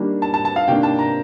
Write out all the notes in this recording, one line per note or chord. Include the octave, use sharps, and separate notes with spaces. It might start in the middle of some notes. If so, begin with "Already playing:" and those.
Already playing: D#3 G3 A#3 D4
A5
A5
A5
F5
C3 D#3 A#3 D4 G5
A5
A#5